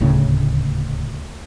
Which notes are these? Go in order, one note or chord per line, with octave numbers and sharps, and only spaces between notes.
D#1 D2 A2 C#3